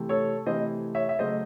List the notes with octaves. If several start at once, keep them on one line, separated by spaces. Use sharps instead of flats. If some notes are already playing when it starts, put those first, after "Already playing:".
Already playing: C3 E3 A3
A4 C#5
C3 E3 A3 C5 D#5
C#5 E5
E5
C#3 F#3 A3 C5 D#5